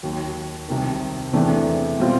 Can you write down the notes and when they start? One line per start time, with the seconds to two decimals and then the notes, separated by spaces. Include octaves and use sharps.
0.03 D#2 D#3 F#3
0.68 C2 C3 D#3
1.33 E2 C3 E3 A3 D4
1.99 B2 G3 C4 F4